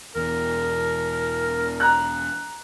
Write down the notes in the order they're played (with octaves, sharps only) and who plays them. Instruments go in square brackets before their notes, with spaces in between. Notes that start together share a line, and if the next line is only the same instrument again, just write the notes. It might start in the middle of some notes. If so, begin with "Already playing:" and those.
[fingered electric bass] E1 E2 B2 [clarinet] A#4
[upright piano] A#5 F#6